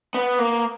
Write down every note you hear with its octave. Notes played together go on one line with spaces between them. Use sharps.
B3
A#3